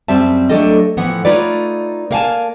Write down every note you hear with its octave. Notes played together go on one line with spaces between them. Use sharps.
F#2 G3 C4 E5 A5
F#3 A3 D4 G4 A4 D#5
A2 E3 F3 B3 F#5
A3 D#4 F4 B4 C#5 D5
A#3 A#4 F5 F#5 G#5 A5